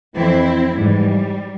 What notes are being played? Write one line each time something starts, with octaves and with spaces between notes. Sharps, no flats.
F2 E3 C4 E4
G#2 E3 G3